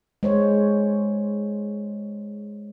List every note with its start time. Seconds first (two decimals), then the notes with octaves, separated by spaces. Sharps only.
0.23 G#3 C5 C#5